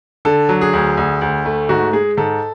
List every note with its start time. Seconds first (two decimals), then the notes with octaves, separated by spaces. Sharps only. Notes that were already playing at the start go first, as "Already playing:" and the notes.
0.25 D3 A4
0.49 F#3
0.61 G#4
0.73 D2
0.97 D2
1.21 D2
1.45 A3
1.69 G#2 F#4
1.93 G#3 G#4
2.17 G#2 A4